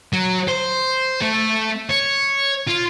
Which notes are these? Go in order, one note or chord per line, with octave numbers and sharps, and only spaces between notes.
F#3
C5
A3
C#5
F4